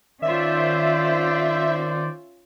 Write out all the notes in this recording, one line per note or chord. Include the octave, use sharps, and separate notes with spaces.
D#3 C#4 F4 C5 D5 E5